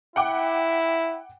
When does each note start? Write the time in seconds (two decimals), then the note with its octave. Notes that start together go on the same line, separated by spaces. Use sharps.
0.16 E4 F#5 G5 D6